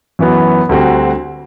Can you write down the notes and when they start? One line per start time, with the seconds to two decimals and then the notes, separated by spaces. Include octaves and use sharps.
0.19 F#2 E3 B3 F#4
0.69 D2 D3 G3 C4 F#4